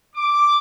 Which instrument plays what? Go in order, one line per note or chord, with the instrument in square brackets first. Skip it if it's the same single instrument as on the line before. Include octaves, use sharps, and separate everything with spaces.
[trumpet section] D6